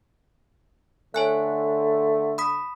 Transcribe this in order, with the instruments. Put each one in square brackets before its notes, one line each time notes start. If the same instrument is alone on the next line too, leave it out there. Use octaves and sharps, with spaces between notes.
[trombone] D3 [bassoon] A3 [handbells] C#5 G#5 F#6
[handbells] B5 D#6 B6